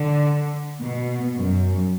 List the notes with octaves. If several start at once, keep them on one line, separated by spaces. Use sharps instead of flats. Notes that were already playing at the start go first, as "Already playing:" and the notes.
Already playing: D3
B2
F#2